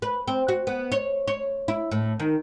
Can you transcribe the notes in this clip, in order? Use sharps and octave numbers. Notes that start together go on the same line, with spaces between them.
B4
C4
F#4
B3
C#5
C#5
E4
A2
D#3